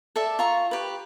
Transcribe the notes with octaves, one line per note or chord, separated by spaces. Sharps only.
A4 D5 E5
F4 A#5 C#6
G4 B4